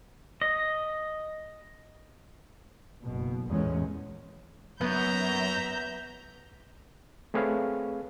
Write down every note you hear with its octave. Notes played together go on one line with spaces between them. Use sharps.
D#5
F#1 B2
A1 E2 A#2 G#3 C#4
F#2 B3 E5 A#5 G6
A3 C4 G#4 B4 C#5 F5